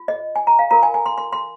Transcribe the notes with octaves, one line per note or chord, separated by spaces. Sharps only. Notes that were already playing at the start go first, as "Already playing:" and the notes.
Already playing: F4
D#5
G#5
A#5
F5
F4 A#4 A#5
G#5
G#5
C6
C6
C6